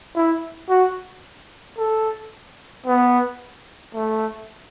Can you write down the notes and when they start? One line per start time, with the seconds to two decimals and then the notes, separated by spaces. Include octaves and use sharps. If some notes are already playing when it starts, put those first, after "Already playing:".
0.16 E4
0.69 F#4
1.78 A4
2.86 B3
3.94 A3